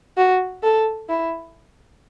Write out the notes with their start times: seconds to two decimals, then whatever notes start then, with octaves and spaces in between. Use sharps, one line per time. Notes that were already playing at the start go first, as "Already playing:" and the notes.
0.17 F#4
0.63 A4
1.09 E4